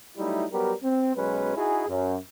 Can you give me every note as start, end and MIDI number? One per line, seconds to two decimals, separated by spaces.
0.18 0.45 54
0.18 0.45 55
0.18 0.45 57
0.18 0.45 63
0.18 0.45 64
0.51 0.73 54
0.51 0.73 55
0.51 0.73 59
0.51 0.73 67
0.51 0.73 70
0.83 1.15 60
1.16 1.55 35
1.16 1.55 54
1.16 1.55 56
1.16 1.55 61
1.16 1.55 71
1.55 1.86 63
1.55 1.86 64
1.55 1.86 66
1.55 1.86 68
1.88 2.16 42